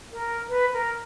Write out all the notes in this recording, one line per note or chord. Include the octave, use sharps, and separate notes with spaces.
A#4
B4
A#4